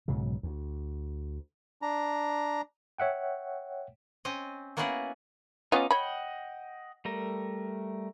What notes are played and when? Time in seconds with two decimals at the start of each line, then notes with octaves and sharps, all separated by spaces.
0.08 B1 G#2 C#3 F#3
0.43 D2
1.82 D4 A#5
2.98 C#5 E5 F#5 G5
4.25 C4 C#4 D#5
4.77 A#3 B3 C#4 E4 F#4 G#4
5.72 B3 C#4 D#4 F4 D#5 D6
5.91 C#5 D#5 F#5 G5 B5
7.05 G3 A3 A#4